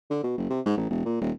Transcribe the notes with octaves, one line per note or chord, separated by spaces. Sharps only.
D3
B2
F#1
C3
G#2
A1
E1
A#2
D#1